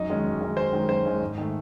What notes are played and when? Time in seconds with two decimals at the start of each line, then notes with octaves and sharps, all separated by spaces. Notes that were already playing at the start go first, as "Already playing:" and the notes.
Already playing: F#2 D#4
0.09 D#3 G#3 C#4
0.24 F#2
0.41 D#3 G#3 C#4
0.56 F#2 C5
0.73 D#3 G#3 C#4
0.89 F#2 C5
1.05 D#3 G#3 C#4
1.20 G#2
1.38 D#3 A3